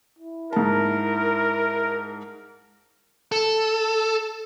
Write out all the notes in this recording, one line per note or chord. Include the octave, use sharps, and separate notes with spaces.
E4
G#2 A#4 A5
A4